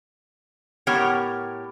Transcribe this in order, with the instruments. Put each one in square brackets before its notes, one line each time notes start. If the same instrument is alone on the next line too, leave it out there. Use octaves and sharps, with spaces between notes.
[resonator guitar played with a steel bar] A2 B3 G4 A#4 C#5